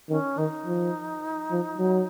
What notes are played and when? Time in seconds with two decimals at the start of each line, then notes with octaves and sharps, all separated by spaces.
0.09 D#3 C#4
0.37 D#3 D#4
0.66 F3
1.51 F3
1.78 F#3